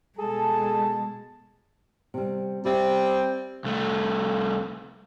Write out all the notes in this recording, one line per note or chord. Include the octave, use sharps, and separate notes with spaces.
B2 G#3 G#4 A4 A5
C3 G3
G3 C4 G4 E5
C2 A3